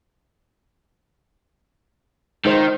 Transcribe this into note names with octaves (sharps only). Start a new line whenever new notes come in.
D#3 G#3 C5